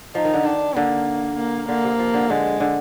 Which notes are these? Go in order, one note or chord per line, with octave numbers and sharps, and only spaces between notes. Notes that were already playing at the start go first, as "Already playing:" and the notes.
F3 D#4
D#3
D3
D#3 D4
D3 A#3
A#3
D3 A#3
C3
F3
D3
D3 G#3
D3